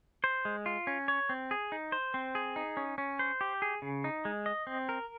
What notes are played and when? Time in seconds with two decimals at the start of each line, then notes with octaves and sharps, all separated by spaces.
0.24 C5
0.45 G#3
0.66 F4
0.87 C#4
1.08 C#5
1.29 C4
1.51 G#4
1.72 D#4
1.92 C5
2.14 C4
2.35 G#4
2.56 D#4
2.77 C#4
2.98 C#4
3.19 C5
3.41 G4
3.62 G#4
3.82 C#3
4.04 D#4
4.25 G#3
4.46 D#5
4.67 C4
4.89 A#4